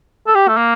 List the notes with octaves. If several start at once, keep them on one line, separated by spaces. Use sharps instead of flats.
A4
G4
A3
A#3